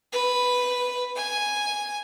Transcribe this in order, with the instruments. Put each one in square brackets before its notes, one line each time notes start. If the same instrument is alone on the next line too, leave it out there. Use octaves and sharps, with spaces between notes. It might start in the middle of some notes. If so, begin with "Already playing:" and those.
[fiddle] B4
G#5